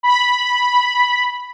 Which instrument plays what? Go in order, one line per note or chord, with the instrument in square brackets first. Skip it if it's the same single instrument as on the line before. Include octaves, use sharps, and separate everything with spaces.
[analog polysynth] B5